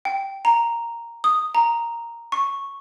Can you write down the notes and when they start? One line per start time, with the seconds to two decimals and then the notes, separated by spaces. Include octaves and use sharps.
0.05 G5
0.45 A#5
1.24 D#6
1.55 A#5
2.32 C#6